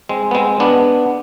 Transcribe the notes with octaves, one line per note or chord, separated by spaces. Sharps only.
G#3 C4
B3
G#3 C4
B3 D4